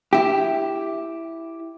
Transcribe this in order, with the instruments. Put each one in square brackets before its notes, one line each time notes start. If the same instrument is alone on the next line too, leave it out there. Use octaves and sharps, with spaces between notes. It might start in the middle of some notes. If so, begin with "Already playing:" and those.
[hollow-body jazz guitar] E4 G4